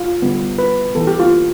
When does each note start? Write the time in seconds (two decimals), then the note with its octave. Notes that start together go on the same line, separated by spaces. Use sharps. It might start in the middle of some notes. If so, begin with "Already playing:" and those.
Already playing: F4
0.22 D3 G3 B3
0.58 B4
0.95 E3 B3 A4
1.07 G4
1.20 F4